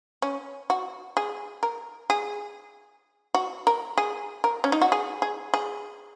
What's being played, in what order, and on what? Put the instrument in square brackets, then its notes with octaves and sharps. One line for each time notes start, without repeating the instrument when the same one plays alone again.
[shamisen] C#4
F#4
G#4
A#4
G#4
F#4
A#4
G#4
A#4
C#4
D#4
F#4
G#4
G#4
G#4